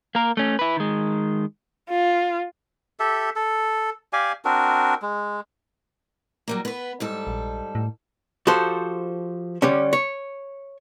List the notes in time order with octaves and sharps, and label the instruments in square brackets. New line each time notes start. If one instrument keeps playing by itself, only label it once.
[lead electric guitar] A#3 A#4
A3 C#4
E4 B4
D#3 G#3
[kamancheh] F4
[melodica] G4 A4 E5
A4
G4 D5 F5 G#5
C4 D4 F#4 A#4
G#3
[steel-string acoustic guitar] F#3 G3 A#3
B3 B4
G#2 G3 A4
[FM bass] A#1
A2
[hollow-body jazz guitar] F3 F#4 G4 A4 C5
D3 G3 C#4
C#5